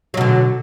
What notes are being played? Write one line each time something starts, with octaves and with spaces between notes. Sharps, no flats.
B2 D3 F#3